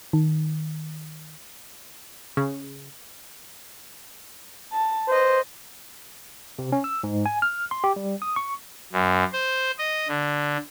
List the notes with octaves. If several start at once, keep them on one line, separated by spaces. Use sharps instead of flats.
D#3
C#3
A5
B4 C5 D#5
C3
C#4
E6
G#2
G#5
F6
C6
G4
G3
D#6
C#6
F#2
C5
D#5
D3